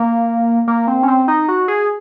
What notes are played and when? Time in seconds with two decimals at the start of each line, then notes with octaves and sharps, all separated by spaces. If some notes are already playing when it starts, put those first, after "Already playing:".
Already playing: A#3
0.67 A#3
0.87 C4
1.03 C#4
1.08 C4
1.28 D#4
1.48 F#4
1.68 G#4